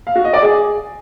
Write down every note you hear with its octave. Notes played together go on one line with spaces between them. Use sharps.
F5
F#4
D#5
D5
G#4